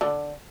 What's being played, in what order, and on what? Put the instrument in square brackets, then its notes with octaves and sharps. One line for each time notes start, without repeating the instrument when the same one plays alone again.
[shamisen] D3